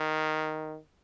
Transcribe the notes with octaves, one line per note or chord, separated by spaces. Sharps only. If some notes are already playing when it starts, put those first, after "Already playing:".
Already playing: D#3